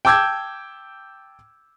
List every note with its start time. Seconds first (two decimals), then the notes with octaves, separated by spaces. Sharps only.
0.05 G5 A5 D6 E6 G6 G#6